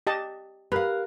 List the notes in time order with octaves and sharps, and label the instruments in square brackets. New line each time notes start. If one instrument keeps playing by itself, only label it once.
[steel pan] G4 D#5 A5
[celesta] G4 F#6 [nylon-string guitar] A#4 F5 [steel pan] B4